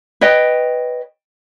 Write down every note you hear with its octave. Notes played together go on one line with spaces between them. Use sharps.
B4 C#5 D#5 G5